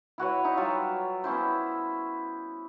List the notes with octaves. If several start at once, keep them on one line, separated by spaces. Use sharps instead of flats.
E4 F#4 B4 C#5
D#4 E5 C#6
F#3 G3 F4 E5
B3 C#4 E4 C5